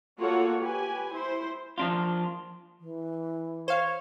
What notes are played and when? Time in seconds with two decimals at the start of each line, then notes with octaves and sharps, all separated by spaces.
0.19 A#3 F4 F#4 A4 C#5 F#5
0.60 G4 B4 G#5
1.13 E4 C5
1.78 F3 D4 F4
2.80 E3
3.68 C5 C#5 F5